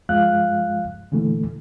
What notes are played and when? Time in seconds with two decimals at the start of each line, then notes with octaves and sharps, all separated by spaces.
0.09 G2 F3 G#3 F5 F#6
1.12 A#2 D3 E3 A3